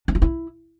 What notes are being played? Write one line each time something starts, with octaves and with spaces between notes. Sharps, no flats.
D4
F4
E4